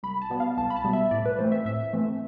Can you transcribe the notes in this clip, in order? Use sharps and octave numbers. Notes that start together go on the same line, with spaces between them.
C2 B5
A5
B2 G3 B3
F5
C2 A5
B5
A5
B2 G3 B3
E5
A2 D5
B4
E3 A3 C4 C5
E5
A2 E5
E3 A3 C4